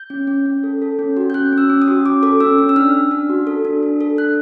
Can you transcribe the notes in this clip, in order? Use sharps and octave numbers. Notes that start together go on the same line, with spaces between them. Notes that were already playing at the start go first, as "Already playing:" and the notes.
Already playing: G6
C#4
C#4
C#4
A4
A4
C#4
F#4
G6
C#4 F#6
C#4
E6
C#4
D#6
F#4
C#4 D6
A4 D6
C#4 E6
C#4
E6
D4 F6
D4
D4
F#4
A4
D4
D4
A4
D4 F#6